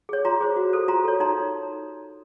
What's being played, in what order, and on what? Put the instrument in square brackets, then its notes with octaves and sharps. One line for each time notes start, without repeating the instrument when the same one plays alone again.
[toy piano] G#4 C#5
F4 A#5 C6
G#4 C5
F#4
A4 C5
F4 A#5 C6
A4 C#5
D#4 A#5 C6